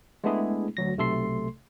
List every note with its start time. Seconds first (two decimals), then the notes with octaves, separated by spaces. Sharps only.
0.24 G#3 A3 B3 D4 E4 G#4
0.77 D2 F#3 A#6
0.97 B1 C3 A3 A4 C6 C7